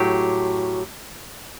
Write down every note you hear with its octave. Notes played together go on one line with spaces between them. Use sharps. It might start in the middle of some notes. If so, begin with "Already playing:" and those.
Already playing: A2 F#3 G4